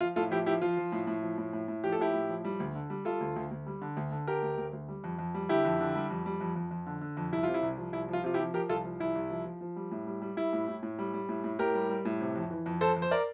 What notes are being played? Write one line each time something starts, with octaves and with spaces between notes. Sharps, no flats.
F3 F4
A2 F4 A4
F3 E4 G4
F3 E4 G4
F3 F4
F3
A2
A2
F3
A2
A2
A2
F3 G4
A4
A2 E4 G4
A2
F3
G3
D2
D3
G3
G3 F4 A4
D2
D2
D2
G3
D3
D2
D3
D3 G4 A#4
D2
D2
D2
G3
F2
F2
G3
D3 E4 G4
F2
D3
G3
F2
G3
F2
F2
F2
D3
D3
F2
C2 E4
C3 F4
E4
C2
F3
C2 E4
F3 F4
C3 F4
E4 G4
F3
F3 G4 A#4
C2 F4 A4
F3
C2 E4
C2
F3
F3
F3
G3
A2
G3
G3
G3 E4
A2
A2
A2
G3
G3
A2
A2
A2 G4 A#4
G3
G3
A2
C3
F2
E3
F2
F2 A4 C5
F2
C5
A#4 D5